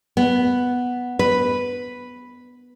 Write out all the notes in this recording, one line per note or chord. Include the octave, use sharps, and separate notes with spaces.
B3
B4